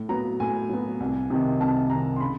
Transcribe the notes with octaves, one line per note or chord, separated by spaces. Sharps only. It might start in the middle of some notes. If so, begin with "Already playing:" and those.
Already playing: A2
F#3 B3 A#5
A2 G#5
F#3 B3
C2
C3 D#3
C2 A5
C3 D#3 A#5
C6
C#3 B5